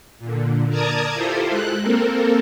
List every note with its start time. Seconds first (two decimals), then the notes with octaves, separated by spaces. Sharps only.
0.19 A#2 D3
0.69 A#4 D5 A5 A#5 D#6 G#6
1.14 E4 F4 G4 A4 C5
1.49 G#3 F#6
1.82 A#3 C4 A4 A#4